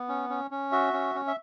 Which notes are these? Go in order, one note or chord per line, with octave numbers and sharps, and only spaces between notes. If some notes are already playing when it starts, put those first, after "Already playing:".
Already playing: B3
C#4
C#4
C#4
F#4 E5
C#4
C#4
E5